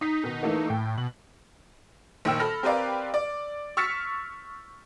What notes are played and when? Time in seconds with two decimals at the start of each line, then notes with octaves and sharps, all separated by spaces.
0.01 D#4 D#6 B6
0.24 B2 D#3
0.43 E3 A3 A#3
0.70 A2 G5
0.98 B2 F#7
2.25 A#1 D#3 G5 E6
2.40 A4 B5 F6 A#6
2.63 C4 G4 A#4 B4 D5 F5
3.14 D5
3.77 C#6 E6 F6 A6 B6 C#7